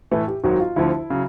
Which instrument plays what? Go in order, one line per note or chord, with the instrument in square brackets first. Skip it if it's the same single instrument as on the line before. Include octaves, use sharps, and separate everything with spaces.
[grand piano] A2 E3 A3 [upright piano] B4
[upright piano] G4
[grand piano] G#1 G#2 D#3 F#3 [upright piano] F#4
[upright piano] F4
[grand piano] D2 D3 F3 [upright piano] E4
[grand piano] C#3 F#3